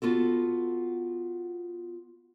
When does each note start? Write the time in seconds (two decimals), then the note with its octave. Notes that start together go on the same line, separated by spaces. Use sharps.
0.02 B3 F4 F#4 A4